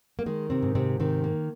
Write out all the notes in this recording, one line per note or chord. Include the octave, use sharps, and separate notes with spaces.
A#3
D#3 G#3
C3 C4
G#2
C3 C4
C3 D#3 C4
A#3